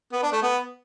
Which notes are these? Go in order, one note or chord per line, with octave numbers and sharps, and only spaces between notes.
B3
D4
A3
B3